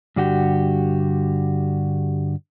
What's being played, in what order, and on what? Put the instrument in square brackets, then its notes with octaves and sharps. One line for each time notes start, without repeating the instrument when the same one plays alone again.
[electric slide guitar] G2 D3 F#4 G4